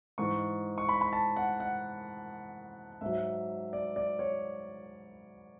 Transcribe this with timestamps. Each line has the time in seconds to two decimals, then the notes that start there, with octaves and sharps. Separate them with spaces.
0.18 G#2 E3 C#6
0.78 C#6
0.89 B5
1.01 B5
1.13 A5
1.36 F#5
1.60 F#5
3.01 G#2 F#3 E5
3.73 D5
3.96 D5
4.19 C#5